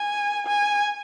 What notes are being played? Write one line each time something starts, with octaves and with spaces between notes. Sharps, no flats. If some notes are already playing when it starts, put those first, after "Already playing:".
Already playing: G#5
G#5